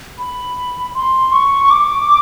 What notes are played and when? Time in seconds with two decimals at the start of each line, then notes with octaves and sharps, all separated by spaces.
0.19 B5
0.95 C6
1.32 C#6
1.64 C#6
1.70 D6